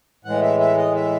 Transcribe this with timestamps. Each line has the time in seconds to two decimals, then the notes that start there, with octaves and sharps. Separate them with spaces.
0.24 A2 E3 G#3 F#5
0.42 E5
0.60 E5
0.77 D#5
0.95 E5